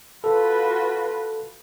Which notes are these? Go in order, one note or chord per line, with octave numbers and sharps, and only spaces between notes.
F4 F#4 A4 B4